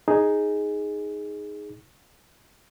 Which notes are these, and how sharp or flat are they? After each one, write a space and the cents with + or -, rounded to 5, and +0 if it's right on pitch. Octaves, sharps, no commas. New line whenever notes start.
D#4 +0 G#4 +0